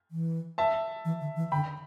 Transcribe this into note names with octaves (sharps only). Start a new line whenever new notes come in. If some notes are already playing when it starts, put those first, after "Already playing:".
E3
E5 A5
E3
D3
E3
D3 G5 B5